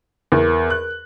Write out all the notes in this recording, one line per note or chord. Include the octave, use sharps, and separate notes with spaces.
E2 A#4
F#6